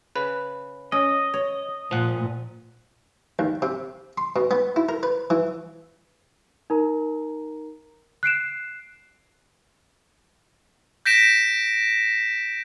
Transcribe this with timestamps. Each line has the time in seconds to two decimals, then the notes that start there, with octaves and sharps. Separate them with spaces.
0.15 C#3 B4
0.92 C#4 D#5
1.34 C#5
1.91 A#2 F3 F#5
3.39 D#2
3.62 C3
4.18 C6
4.36 B2
4.51 B3
4.76 E4
4.89 A#4
5.03 B4
5.30 E3
6.70 D#4 A#4 A#5
8.23 F#6 C7 D7 E7
11.05 G6 A#6 B6 D7 E7